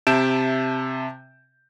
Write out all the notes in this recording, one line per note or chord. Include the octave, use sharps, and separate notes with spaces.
C3 E5 A5 G6 D7 E7